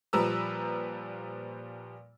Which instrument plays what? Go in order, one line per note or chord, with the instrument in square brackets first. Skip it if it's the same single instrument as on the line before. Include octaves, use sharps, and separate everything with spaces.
[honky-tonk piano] A#2 F3 G3 B4 A#5 E6